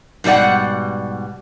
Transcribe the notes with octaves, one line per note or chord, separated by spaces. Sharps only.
G#2 B2 G3 D5 F#5